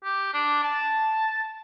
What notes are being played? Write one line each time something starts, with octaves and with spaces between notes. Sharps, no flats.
G4
D4
A5